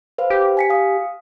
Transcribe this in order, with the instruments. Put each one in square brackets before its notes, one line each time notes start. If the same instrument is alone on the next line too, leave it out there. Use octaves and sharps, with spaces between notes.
[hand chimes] B4 C5 F5
[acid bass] G4
[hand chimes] G#5 B6 C#7
F5 D#6